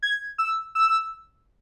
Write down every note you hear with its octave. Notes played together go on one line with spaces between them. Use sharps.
G#6
E6
E6